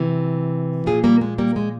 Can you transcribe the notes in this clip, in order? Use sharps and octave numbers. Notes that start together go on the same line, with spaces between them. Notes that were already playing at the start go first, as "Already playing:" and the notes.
Already playing: C3 E3
A#2 F3 F4 G#4
G3 A#3
G#3
G3 A#3
G#3